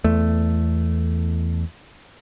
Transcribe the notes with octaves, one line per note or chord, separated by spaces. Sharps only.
E2 A3